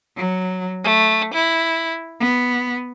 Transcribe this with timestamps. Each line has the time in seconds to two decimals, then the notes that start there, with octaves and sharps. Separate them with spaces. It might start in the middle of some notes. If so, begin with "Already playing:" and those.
0.17 F#3
0.83 A3
1.33 E4
2.20 B3